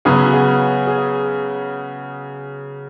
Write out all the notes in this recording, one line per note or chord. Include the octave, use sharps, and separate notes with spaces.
C#3 F#3 B3 G#4
F#4
G#4
G#4